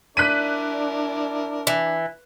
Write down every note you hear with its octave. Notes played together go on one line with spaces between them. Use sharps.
D4 E4 A#4 D5 F#6 B6 D#7
E3